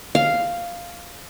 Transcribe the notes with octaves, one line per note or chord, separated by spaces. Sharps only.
F5